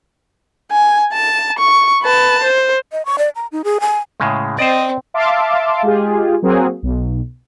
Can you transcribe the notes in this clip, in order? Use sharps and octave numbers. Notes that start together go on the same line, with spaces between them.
G#5
A5
C#6
B4 A5
C5
D#5
C#6
D5
A#5
D#4
G#4
G#5
A2 C#3 G#3
C4 C5 D5 D#5
E5 F5 A5 C6 D6
G#3 F4 G4 G#4
F#3 A#3 C4 F#4 G#4
B1